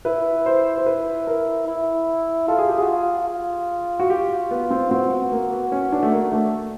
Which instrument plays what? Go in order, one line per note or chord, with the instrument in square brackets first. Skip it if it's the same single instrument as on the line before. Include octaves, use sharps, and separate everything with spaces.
[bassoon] E4 [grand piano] B4
[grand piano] C5
C5
B4
A#4
[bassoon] E4
[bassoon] F4 [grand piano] A4
[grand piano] G#4
G4
[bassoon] F#4 [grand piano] G#4
[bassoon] F4
F4
[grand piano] F#4
G4
B3
C4
[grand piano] C4 [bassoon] F#4
[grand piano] B3
A#3
B3
C#4
D4
A3
A#3
A3